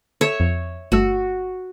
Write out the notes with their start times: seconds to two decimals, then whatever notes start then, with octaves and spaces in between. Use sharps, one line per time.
0.21 A4 C#5 E5
0.40 F2
0.92 G1 A3 F#4 E6